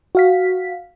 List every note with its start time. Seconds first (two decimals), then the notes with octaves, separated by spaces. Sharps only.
0.15 F#4 F5 B6